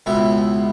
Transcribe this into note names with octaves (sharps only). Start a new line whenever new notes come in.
C#2 B2 E4